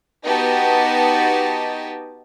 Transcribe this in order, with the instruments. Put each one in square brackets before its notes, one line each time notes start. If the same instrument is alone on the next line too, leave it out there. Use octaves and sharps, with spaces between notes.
[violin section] B3 D#4 F#4 G4 D#5 A5